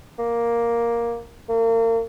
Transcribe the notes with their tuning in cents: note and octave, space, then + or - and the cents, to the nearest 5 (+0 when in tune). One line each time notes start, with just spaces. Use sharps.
A#3 +5
A#3 -35